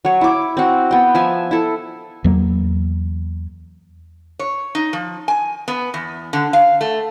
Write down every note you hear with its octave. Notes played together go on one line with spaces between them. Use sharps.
F#3 C#5
E4 D6
C4 F#4
B3 G5
F3 E5 G#5 A5
E4 A4
E2 F#3 A#3
C#5
D#4
F3
G#5
B3
E2
D3
F5
A3